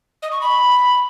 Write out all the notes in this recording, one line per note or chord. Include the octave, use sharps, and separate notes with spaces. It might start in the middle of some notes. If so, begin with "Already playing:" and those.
D#5
C#6
B5